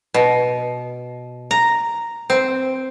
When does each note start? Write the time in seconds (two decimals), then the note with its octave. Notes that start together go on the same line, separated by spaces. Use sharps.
0.14 B2
1.51 A#5
2.30 C4